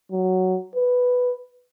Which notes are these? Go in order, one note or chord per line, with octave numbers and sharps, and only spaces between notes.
F#3
B4